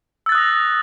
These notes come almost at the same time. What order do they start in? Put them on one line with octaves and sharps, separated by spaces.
E6 A6 F#6 D#6 A#6